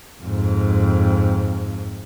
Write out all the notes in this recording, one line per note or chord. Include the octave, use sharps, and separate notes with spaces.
F2 G#2